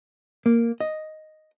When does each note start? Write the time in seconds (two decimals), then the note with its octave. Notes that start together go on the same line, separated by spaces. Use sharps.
0.46 A#3
0.80 D#5